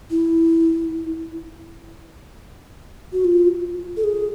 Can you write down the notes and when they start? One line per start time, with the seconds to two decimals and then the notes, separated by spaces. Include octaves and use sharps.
0.11 E4
3.13 F#4
3.24 F4
3.97 A4
4.04 G#4